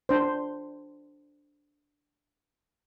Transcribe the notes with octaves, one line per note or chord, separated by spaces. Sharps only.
D4 C5